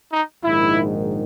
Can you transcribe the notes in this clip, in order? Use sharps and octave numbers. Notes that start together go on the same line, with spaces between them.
D#4
A#1 G#2 D#3 E4